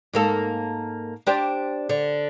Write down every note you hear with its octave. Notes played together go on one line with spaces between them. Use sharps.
G#2 A#3 A4
D4 G4 C5
D3